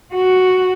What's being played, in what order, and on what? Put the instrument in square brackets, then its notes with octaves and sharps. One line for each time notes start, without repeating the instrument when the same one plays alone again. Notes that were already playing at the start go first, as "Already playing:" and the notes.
[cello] F#4